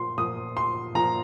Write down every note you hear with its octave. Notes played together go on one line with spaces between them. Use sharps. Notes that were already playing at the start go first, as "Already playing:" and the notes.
Already playing: A#2 F3 C6
A#2 F3 D#6
C6
A#2 F3 A#5